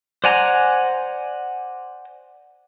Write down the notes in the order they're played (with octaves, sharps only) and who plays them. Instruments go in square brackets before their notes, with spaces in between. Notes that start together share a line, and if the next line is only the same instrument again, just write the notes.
[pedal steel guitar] C5 D5 F#5 G#5 A#5